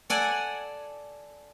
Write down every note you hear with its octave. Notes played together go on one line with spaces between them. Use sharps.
A4 D5 F#5 G#5